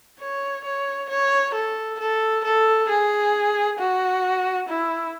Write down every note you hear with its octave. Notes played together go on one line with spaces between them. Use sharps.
C#5
C#5
C#5
A4
A4
A4
G#4
F#4
E4